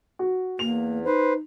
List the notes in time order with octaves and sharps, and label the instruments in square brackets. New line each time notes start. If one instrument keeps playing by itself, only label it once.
[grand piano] F#4
[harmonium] E2 [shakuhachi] A#3 [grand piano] F7
[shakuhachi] D#4 [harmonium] B4 C5